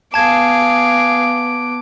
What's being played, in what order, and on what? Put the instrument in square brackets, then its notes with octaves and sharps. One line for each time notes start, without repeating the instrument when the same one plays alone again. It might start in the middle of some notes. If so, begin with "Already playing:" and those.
[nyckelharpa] B3 D6 [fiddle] G#4 F5 [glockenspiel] A5 G#6